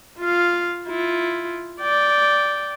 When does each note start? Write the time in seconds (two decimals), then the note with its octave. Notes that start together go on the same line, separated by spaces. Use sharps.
0.19 F4 F5
0.87 E4 F4
1.81 D5 G5